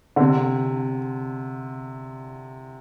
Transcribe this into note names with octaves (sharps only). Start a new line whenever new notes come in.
D3
C3